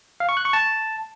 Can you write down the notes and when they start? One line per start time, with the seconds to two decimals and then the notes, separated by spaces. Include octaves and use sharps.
0.20 F5
0.29 C#6
0.37 F#6
0.45 C#6
0.53 A5